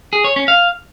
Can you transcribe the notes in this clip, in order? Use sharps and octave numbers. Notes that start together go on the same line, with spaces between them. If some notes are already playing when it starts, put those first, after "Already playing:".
G#4
C#5
C#4
F5